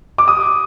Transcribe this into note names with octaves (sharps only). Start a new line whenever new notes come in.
D6
D#6